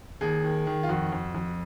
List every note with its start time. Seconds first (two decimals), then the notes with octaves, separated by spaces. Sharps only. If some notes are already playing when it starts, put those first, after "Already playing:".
0.21 D#2 G#4
0.44 D#3
0.67 D#3
0.83 F4
0.89 F2 F#4
1.12 F2
1.35 F2